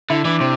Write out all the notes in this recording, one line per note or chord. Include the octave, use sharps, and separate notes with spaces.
D3 E4
E3 D4
C3 C4